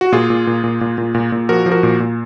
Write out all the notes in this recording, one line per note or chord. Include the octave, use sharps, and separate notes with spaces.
F#4
A#2 F4 G#4
A#2
A#2
A#2
A#2
A#2
A#2
A#2
F3 F#4 A#4
F3
F#4 A#4
A#2
A#2